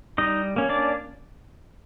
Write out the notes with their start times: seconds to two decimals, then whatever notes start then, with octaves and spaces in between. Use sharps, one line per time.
0.18 G3 D#4 D#5
0.56 A#3 C#4
0.69 D4 D5